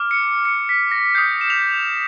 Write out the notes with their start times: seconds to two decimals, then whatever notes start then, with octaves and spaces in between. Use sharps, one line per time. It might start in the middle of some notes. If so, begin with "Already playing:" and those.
Already playing: D6 F6
0.11 C#7
0.45 C#7
0.69 B6
0.92 A#6
1.15 D#6 G6 C7
1.41 E7
1.50 F7